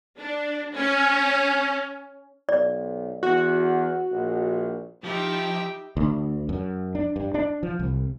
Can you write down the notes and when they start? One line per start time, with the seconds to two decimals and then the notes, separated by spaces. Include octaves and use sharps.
0.18 D4
0.75 C#4
2.49 B1 D5
3.23 E2 F#4
4.12 A#1
5.04 F3 D#4 E4 G4 E5 G5
5.97 D2
6.49 F#2
6.95 D4
7.16 G2
7.34 D4
7.63 F3
7.79 C2